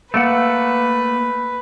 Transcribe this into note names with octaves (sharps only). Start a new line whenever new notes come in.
A3 A#3 B4 F#5